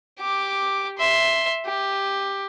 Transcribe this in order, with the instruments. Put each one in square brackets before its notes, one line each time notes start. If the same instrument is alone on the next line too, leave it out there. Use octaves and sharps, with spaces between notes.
[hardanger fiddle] G4 D6
E5 C6
G4